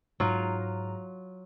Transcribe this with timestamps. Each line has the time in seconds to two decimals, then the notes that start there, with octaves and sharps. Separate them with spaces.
0.20 G#2 F#3 F4 A#5